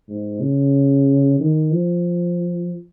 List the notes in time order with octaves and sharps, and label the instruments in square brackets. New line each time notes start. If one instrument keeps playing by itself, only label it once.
[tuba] G#2
C#3
D#3
F3